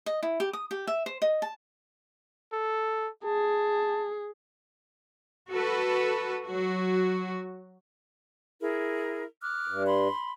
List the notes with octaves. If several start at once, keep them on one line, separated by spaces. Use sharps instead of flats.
D#5
E4
G4
D#6
G4
E5
C5
D#5
A5
A4
G#4 A5
F#4 A4 B4
F#3 F#4
E4 G#4 A#4
D6 F6 F#6
G2
B5 C6